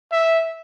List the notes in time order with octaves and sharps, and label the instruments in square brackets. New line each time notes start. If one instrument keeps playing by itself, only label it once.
[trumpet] E5